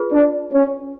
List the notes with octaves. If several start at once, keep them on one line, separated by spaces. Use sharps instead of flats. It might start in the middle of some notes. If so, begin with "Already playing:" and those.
Already playing: F4 G#4 B4
D4
C#4